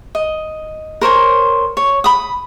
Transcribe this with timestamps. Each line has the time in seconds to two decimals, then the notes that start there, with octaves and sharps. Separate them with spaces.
0.15 D#5
1.01 A#4 C5 C#5 G#5
1.77 C#5
2.04 B5 D#6